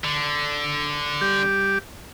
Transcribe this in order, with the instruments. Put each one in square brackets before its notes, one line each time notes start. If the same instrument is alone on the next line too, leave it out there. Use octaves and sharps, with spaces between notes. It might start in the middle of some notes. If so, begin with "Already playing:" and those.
[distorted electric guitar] D3
[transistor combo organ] G3 G4